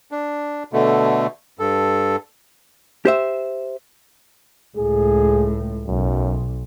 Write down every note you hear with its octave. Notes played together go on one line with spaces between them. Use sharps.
D4
B2 D3 A3
G2 A4
G4 C5 E5
C#2 A2 G#4
B1 F#2